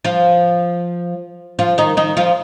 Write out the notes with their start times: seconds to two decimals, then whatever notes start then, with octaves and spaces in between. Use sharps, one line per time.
0.05 F3 F4
1.59 F3 F4
1.78 D#3 D#4
1.97 D#3 D#4
2.17 F3 F4